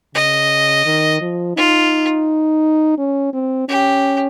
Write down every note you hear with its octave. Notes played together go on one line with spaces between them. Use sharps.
C#3 D#5
D#3
F3
D#4 F4
C#4
C4
C#4 G4